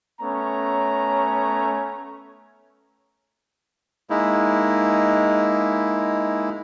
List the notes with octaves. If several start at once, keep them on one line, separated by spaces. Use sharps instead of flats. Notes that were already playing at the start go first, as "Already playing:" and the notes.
A3 B3 C#4 C#5 A#5
G#3 A#3 D#4 E4